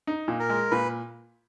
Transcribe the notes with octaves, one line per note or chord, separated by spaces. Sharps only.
D#4
A#2
A#4
G#3
A#2 B4